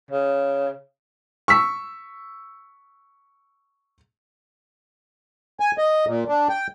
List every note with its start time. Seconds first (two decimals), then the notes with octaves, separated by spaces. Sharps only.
0.11 C#3
1.48 C#6 E6 B6
5.60 G#5
5.78 D#5
6.07 A#2
6.28 D4
6.49 G5